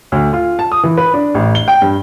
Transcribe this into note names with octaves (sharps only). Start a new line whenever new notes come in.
D2
F4
A5
D#6
E3
B4
D4
A1
G7
G5
G2